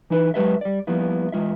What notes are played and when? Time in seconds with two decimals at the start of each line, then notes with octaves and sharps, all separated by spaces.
0.10 E3 D#4 E4 B4
0.34 F#3 G#3 G4 B4 C5 E5
0.61 G3 D5
0.87 F3 G3 A#3 B3 E4
1.32 E2 G#3 F4 E5